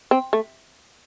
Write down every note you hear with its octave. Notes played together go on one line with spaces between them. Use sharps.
C4
A3